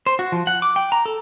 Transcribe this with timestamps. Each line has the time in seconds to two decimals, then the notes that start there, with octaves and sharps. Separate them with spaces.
0.06 C5
0.19 F#4
0.32 F3
0.47 F#5
0.62 D6
0.76 G5
0.92 A#5
1.06 A4